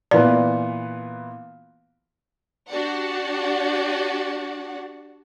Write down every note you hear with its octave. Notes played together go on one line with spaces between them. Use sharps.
A#2 E3 B3 D5
D4 F#4 G4 D5 F#5